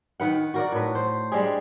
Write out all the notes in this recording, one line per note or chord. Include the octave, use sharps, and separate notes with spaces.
D#3 B4 F#5
F#4 A#4 D5
A2 B4
C5
G3 G#3 D4 G#4